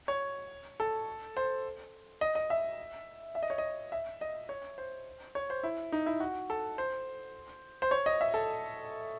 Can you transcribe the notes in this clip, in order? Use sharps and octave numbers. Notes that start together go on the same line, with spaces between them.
C#5
A4
C5
D#5
D#5
E5
E5
D#5
C#5
D#5
E5
D#5
C#5
C5
C#5
C5
E4
D#4
E4
F#4
A4
C5
C5
C#5
D#5
E5
A4